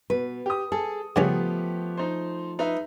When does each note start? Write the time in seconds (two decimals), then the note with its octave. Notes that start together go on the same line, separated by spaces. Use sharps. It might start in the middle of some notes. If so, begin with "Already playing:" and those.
0.10 B2 B4
0.46 G4 D#6
0.72 G#4 A4 A5
1.16 G2 C#3 F3 A3 B3 C#4 G4
1.97 D#4 C5
2.59 D#4 B4 E5